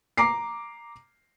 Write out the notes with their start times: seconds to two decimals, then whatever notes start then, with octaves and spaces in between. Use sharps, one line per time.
0.17 A#5 D6 C7